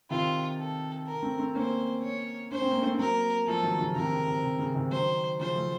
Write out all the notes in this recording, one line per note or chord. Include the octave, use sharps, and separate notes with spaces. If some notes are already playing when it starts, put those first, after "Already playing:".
C3 D#3 F4
A4
A#4
A3 C4
A3 C4
A#3 C#4 C5
C#5
C#4 C5
C4
A#3
A3 C4
C4
F#3 A#3 A#4
F3 A3 A4
D#3 F#3
C#3 F3
C3 D#3 A#4
C#3
C3
C3
C#3
C3 D#3
D#3 F#3 C5
C#3 F3 C5
F3 A3